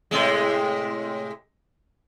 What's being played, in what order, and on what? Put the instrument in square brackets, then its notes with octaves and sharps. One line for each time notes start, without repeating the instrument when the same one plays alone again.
[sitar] A2 C3 G#3